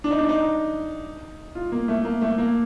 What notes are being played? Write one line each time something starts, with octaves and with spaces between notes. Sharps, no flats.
D4
D#4
D4
D#4
F4
A#3
A3
A#3
A3
A#3